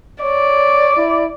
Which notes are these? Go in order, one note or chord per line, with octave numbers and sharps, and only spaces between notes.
C#5 D5
E4